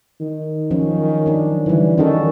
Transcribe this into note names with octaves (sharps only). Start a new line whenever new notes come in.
D#3
F3 F#3 C#4
F#3 D4
D3 E3 G3
D#3 C#4 F#4 A4